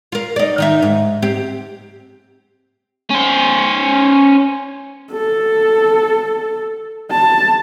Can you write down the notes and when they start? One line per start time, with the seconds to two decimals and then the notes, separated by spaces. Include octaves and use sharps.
0.12 F4 A#4
0.36 D#4 D5
0.58 D#3 D#4 E5
0.82 G#2
1.22 C4 G4
3.10 C#4 C5
5.13 A4
7.11 A5